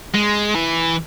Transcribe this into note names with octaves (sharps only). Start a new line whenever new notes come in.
G#3
E3